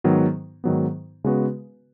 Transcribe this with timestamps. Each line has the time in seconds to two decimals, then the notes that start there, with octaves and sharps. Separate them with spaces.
0.04 G#2 D#3 F#3 B3
0.64 G#2 D#3 F#3 B3
1.24 C#3 G#3 B3 F#4 B4